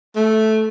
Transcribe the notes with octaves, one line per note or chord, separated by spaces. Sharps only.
A3